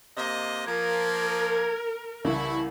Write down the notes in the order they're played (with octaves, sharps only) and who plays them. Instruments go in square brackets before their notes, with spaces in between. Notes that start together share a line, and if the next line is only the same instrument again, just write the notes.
[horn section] C3 A#3 D#5
[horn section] F3 A#3 [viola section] A#4 [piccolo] G#6
[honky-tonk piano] C2 C#3 E3 [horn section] E4 [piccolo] C#6